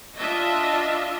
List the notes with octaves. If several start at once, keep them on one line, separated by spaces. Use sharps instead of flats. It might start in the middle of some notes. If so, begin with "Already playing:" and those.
D4 F4 D#5 E5